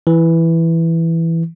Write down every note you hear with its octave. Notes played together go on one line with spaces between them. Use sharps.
E3